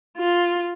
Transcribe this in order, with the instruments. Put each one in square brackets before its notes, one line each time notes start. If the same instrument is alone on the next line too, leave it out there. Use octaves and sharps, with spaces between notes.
[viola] F4